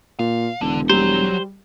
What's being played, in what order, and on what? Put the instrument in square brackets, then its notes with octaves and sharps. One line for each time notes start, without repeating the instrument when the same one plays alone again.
[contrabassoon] A#2 [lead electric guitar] F5
[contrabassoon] E1 [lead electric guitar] D3
[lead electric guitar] F#3 [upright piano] G3 [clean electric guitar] C5